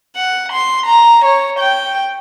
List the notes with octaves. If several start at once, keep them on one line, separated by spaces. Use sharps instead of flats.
F#5
C6
A#5
C#5
G5